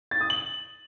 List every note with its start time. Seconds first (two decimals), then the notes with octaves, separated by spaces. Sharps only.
0.11 A6
0.21 D#6
0.30 F#7